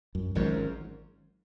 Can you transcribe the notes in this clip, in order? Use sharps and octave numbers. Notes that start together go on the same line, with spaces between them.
F#2
G#1 G#2 F#3 C#4 F4 A#4